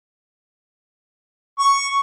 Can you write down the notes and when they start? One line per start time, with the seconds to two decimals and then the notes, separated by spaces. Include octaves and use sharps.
1.59 C#6